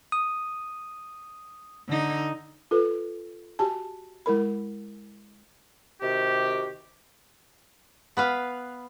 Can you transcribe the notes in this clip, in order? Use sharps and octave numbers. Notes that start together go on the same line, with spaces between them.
D#6
D3 D#4
F4 A4 B4
F#4 G4 G#5 A5
G#3 E4 A#4 B5
C3 D#3 F#4 G4
B3 B4 F5